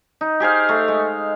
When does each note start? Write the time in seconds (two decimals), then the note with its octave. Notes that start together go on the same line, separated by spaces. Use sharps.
0.21 D#4
0.40 G4 G#4 C5 F5
0.69 A3
0.88 G#3